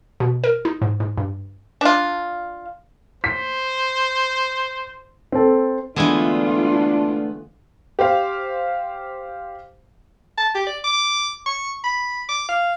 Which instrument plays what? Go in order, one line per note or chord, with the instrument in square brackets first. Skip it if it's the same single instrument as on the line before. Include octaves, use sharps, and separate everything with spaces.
[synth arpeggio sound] B2
A#4
D#4
G#2
G#2
G2
[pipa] D4 F4
[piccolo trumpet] C5 [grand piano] B6
[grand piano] C4 A4
[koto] D3 E3 G#3 [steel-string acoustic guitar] A3 B3 [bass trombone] D4 [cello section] F4
[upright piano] G4 C5 F5
[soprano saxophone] A5
G4
D5
D6
C#6
B5
D6
F5